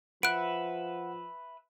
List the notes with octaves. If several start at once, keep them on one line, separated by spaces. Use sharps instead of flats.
F3 B4 E5 F#5 F#6 D7